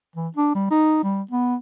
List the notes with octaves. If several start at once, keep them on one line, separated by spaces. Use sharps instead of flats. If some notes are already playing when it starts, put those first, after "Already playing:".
E3
D4
G3
D#4
G3
B3